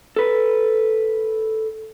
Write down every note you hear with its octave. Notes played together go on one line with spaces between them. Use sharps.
A4 B4